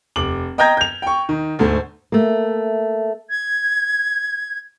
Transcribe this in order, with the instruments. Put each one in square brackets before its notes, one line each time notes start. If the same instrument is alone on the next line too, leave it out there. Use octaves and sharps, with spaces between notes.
[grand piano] F1 D6 F#7
D#5 G5 A#5 G6 G#6 A#6
G6 F7
G5 C#6
D#3
D2 G#2 A3
[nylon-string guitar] A3 A#3
[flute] G#6